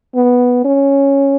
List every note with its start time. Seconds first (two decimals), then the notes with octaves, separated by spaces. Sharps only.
0.16 B3
0.65 C#4